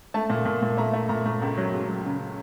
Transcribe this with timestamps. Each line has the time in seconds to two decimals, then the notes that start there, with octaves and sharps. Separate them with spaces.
0.14 A3 A5
0.30 A#2
0.45 A#2
0.63 A#2
0.77 A3 A#5
0.93 A3
1.09 A#2 A#5
1.26 A3
1.42 C#2
1.57 F#3
1.73 C#2
1.88 F#3
2.05 C#3